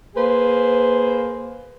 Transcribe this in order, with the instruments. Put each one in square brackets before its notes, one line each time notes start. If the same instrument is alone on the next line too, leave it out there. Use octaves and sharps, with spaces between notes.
[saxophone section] A#3 G#4 B4 C5